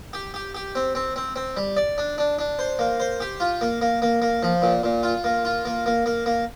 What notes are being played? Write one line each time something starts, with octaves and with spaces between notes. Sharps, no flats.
G4
G4
G4
C4
C4
C4
C4
G3
D5
D4
D4
D4
C5
A#3
C5
G4
F4
A#3
A#3
A#3
A#3
F3
A#2
A#2
F4
A#3
F4
A#3
A#3
A#3
A#3